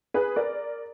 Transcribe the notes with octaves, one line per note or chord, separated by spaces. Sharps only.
G#4 B4
A#4 D5